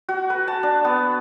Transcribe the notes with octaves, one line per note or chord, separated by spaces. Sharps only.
F#4
B4
A5
D4
B3